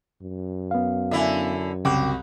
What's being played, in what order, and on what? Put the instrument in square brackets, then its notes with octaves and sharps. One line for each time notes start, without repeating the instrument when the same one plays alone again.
[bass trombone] F#2
[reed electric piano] B3 F5
[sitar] D3 E4 [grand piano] E5 G#5
[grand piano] C2 [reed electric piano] C#3 G5 D6 [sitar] F#4